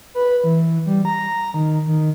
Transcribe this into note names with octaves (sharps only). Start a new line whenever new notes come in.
B4
E3
G3
A#5
D#3
D#3